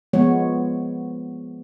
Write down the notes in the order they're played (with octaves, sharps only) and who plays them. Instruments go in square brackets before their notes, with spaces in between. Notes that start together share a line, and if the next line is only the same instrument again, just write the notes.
[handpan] F3 G#3 B3 C#5